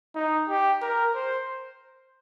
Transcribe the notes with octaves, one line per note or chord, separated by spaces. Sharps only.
D#4
G4
A#4
C5